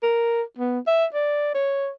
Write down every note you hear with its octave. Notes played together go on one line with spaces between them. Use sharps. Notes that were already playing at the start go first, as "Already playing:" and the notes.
A#4
B3
E5
D5
C#5